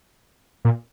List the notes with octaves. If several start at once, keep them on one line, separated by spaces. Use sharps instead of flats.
A#2